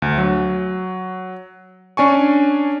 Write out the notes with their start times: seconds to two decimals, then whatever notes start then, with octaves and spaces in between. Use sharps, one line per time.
0.02 D2
0.18 F#3
1.97 C#4 D4 G#5 C#6